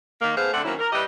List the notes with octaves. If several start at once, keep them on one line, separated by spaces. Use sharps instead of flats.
D#3 A#3
A3 B3 G#4 B4 C5 F5
D3 A3 C4 D5 F#5
D#3 F#3 A#3 C4 C#4 E4
A#4
G3 E4 G4 B4 D#5